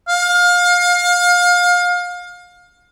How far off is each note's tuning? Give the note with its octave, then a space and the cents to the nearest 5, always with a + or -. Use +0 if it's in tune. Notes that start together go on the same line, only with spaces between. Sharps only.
F5 +30